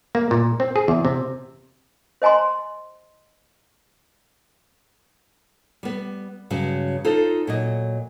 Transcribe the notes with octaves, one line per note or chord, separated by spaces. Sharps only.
A#3
A#2
C4
G#4
E2
C3
C5 D#5 G#5 A#5 C6
G3 B3
G2 C#3 F#3
D#4 F4 A4 C5
A#2 F#3 D#5